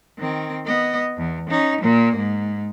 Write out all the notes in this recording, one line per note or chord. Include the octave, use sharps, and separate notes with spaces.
D#3 C4
B3 D#5
E2
C#4 D#4
A#2 A#3
G#2